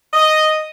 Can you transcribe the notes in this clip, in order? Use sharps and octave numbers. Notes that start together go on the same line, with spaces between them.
D#5